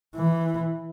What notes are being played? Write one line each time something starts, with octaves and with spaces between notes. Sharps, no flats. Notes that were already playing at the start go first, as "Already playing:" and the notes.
E3